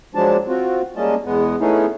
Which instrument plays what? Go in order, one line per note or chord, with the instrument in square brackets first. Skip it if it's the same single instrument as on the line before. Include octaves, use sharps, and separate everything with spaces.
[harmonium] F3 F#3 G#3 D4 A5
C4 F4 F#4
G3 G#3 A#3 C#4 D#5 A5
E2 G#3 B3
A3 B3 C#4 D#4 E4 G#4